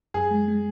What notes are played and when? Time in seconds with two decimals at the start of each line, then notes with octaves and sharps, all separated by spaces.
0.14 F#2 G#4
0.31 G#3
0.48 G#3